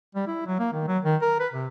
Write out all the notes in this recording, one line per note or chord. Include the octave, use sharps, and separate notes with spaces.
G3
E4
F#3
A#3
D#3
F#3
D#3
A#4
B4
C3